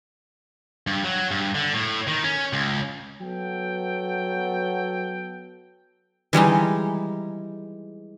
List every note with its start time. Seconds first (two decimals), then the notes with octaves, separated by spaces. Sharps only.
0.87 G2
1.04 F#3
1.31 G2
1.55 D3
1.73 A2
2.08 D#3
2.24 C#4
2.53 C#2
3.21 F#3 B3 A4 G5
6.33 E3 G3 G#3 D#4